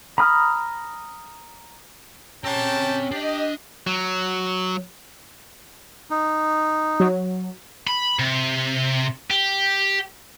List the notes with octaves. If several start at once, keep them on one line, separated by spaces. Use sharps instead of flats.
A#5 B5 D#6 F6
C4 C#4 G4 G5 A5 A#5
D4 G4 D#5
F#3
D#4
F#3
B5
C3
G4